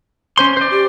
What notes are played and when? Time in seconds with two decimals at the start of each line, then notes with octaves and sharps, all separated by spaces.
0.38 C#4 C5 C6
0.57 C5 D5
0.72 G4